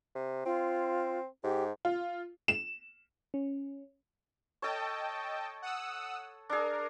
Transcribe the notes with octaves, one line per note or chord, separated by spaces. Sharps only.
C3
C4 F4
G#2 G4
F4
E7
C#4
A4 C#5 D#5 G5 A5
F#5 D#6 E6
D4 G#4 A#4